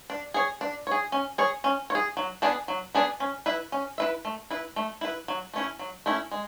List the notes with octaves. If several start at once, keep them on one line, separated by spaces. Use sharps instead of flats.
D4
G#4 C#5
D4
G#4 C#5
C#4
G#4 C#5
C#4
C#5
G#4
F#3
B3 D4 G#4 D5
F#3
B3 D4 G#4 D5
C#4
E4 B4 E5
C#4
E4 B4 E5
A3
E4 B4
A3
E4 B4
F#3
A3 C#4 E4
F#3
A3 C#4 E4
G#3